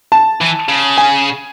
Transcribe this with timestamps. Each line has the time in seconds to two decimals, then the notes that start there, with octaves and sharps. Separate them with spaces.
0.12 A5
0.41 E3
0.69 C#3
0.98 G#5